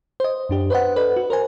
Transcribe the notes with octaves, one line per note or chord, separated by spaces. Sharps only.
C5 D#5
F#2 D4 G4
B4 C5 D#5 F#5
A4 B4 D5 D#5
F#4
A#4 C5 G#5